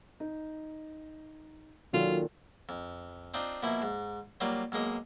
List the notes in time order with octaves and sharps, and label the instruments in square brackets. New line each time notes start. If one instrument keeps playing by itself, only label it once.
[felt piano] D#4
[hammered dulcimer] A#2 [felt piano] D#3 A4 [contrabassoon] F#3 [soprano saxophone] F4
[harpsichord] F2
C4 D4 D#4 F4
B2 F3 A#3 E4
G#2
F#3 G3 A#3 F4 D6
B1 G#3 A#3 D#5